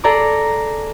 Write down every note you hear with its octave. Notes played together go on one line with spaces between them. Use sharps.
G#4 A4 D5 G#5 A#5 D6